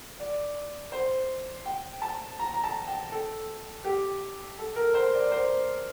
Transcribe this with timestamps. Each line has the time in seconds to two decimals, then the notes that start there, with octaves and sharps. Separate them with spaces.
0.19 D5
0.92 C5
1.66 G5
2.02 A5
2.39 A#5
2.54 A#5
2.64 A5
2.87 G5
3.12 A4
3.85 G4
4.59 A4
4.76 A#4
4.94 C5
5.14 D5
5.31 C5